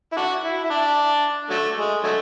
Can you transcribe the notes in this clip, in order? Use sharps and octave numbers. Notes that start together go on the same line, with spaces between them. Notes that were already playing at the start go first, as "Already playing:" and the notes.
E4
D4 F#4
E4
E4
D4
D3 F#3 A3
G#3
D3 F#3 A3